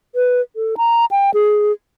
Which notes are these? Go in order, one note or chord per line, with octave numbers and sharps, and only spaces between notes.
B4
A4
A#5
G5
G#4